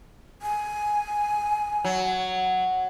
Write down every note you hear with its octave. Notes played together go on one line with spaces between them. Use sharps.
G#5
F#3